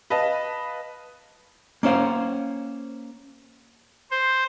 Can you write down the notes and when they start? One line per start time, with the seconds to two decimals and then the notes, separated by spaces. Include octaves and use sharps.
0.10 B4 D#5 F5 A5
1.83 A#3 C#4 C5 F5
4.11 C5